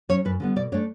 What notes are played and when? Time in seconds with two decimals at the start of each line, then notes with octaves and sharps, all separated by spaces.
0.09 F#3 C#4 C#5
0.25 F#2 B4
0.40 D3 G3 B3
0.56 B2 D5
0.72 A3 D4 C#5